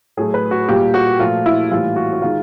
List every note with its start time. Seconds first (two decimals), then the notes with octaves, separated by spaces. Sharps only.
0.17 A2 F#3 A3 G#4
0.34 B4
0.51 F#4
0.68 A#2 G3 A#3 G4
0.94 F#4
1.19 A#2 F3 A3 F4
1.46 E4
1.71 A2 E3 G3 A#3 F4
1.96 F#4
2.13 F#4
2.22 D#3 G#3 F4